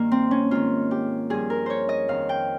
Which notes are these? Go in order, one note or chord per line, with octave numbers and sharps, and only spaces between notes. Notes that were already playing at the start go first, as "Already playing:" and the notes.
Already playing: G2 D#3 A#3
C4
C#4
G#2 D#3 F4
G4
G2 F3 G#4
A#4
C5 C#5
D#5
F2 D#3 F5
G5